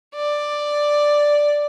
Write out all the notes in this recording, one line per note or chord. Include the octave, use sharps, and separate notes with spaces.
D5